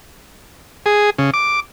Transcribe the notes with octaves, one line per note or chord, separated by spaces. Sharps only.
G#4
C#3
D6